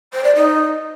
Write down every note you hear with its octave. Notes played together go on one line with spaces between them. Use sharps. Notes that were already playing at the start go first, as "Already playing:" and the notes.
C5
D5
D#4